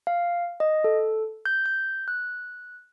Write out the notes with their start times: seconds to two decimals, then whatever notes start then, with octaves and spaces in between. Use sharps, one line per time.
0.07 F5
0.60 D#5
0.84 A4
1.45 G6
1.66 G6
2.08 F#6